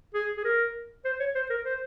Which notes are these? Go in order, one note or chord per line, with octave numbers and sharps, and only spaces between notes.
G#4
G#4
A#4
C5
C#5
C5
A#4
C5